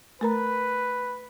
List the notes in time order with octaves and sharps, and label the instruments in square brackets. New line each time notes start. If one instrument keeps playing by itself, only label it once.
[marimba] A3 A#4 A#5 [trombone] B4